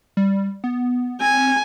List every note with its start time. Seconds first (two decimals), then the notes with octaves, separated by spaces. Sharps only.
0.17 G3
0.64 B3
1.21 C4 G#5